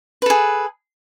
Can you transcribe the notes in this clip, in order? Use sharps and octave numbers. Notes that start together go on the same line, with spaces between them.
G#4 A4 B4